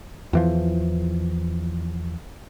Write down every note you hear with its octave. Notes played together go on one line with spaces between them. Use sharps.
E2 E3 F3